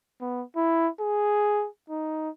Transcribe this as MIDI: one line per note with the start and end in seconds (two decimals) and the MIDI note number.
0.21 0.43 59
0.56 0.88 64
1.00 1.68 68
1.90 2.30 63